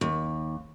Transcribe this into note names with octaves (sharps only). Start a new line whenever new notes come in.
D#2